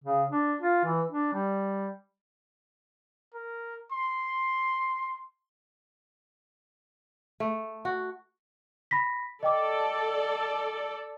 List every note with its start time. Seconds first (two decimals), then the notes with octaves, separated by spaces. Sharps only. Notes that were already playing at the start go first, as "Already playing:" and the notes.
0.04 C#3
0.30 D4
0.61 F4
0.85 E3
1.11 D4
1.33 G3
3.34 A#4
3.92 C6
7.40 A3
7.85 F#4
8.91 B5 A#6 B6
9.43 A4 D5 D#5 G5 D6